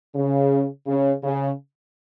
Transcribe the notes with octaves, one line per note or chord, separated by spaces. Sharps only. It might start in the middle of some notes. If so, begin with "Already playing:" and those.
C#3
C#3
C#3